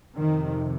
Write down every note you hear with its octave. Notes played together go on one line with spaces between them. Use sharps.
F2 C3 D#3